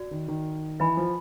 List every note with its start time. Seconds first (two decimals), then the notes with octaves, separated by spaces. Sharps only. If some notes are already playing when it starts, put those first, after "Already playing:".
Already playing: F#4 D5
0.11 D#3
0.28 D#3
0.80 E3 B4 D#5 G#5 B5
0.97 F3